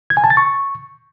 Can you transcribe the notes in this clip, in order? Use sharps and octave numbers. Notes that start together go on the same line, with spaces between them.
G#6
G#5
A5
A6
C#6